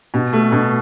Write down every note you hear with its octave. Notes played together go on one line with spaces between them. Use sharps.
B2
A3
B2